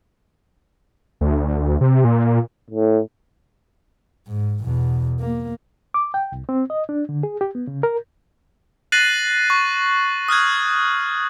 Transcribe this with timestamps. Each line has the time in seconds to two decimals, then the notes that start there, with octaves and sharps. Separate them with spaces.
1.21 D2
1.81 C3
2.04 A#2
2.70 A2
4.27 G#2
4.63 E2 B2
5.20 A#3
5.94 D6
6.14 G5
6.32 C2
6.49 C4
6.70 D#5
6.89 D4
7.09 D3
7.23 G#4
7.41 G4
7.55 B3
7.67 C#3
7.83 A#4
8.92 F#6 A6 A#6 C7 D#7 F#7
9.50 C#6
10.28 D#6 F6 F#6 G#6